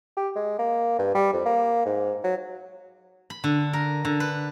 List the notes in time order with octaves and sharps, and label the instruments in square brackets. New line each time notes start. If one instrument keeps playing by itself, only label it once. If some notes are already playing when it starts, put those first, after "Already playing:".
[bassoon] G4
G#3
A#3
G2
G3
F2
A#3
G#2
F#3
[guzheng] B5
D3
A#4
D3
B4